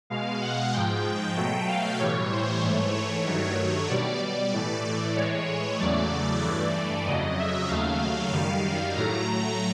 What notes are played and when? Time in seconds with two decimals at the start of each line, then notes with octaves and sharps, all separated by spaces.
0.10 B2 G#3 F5
0.41 F#5
0.73 G#2 F3 G#3 G5
1.36 B2 F#3 A3 G5
1.68 F5
1.99 A2 E3 G3 C#5
2.32 C5
2.62 G#2 E3 A3 C#5
2.95 C#5
3.26 G2 D#3 F#3 A3 C#5
3.89 B2 G3 D5
4.21 D5
4.52 A2 E3 A3
5.16 A2 E3 G#3 C#5
5.79 E2 C#3 F#3 A3 D5
6.43 G2 E3 A3
7.06 F2 C#3 F#3 D#5
7.38 E5
7.68 D#2 C#3 F#3 A3 F5
8.32 F#2 D#3 G3
8.96 A2 F#3 A3 A#5
9.28 A#5